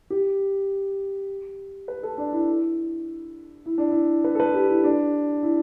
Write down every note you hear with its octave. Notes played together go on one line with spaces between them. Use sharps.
G4
B4
A4
D4
E4
E4
D4
E4
B4
A4
B4
G4
E4
D4
E4